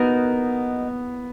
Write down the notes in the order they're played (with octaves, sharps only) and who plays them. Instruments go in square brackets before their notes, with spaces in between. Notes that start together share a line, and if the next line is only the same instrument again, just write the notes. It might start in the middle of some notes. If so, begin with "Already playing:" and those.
Already playing: [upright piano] B3 [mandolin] D#4 F#4 A#4